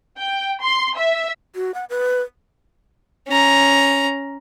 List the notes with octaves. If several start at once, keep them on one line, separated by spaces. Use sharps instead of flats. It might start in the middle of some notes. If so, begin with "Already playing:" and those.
G5
C6
E5
F#4
F#5
B4
C#4 A#5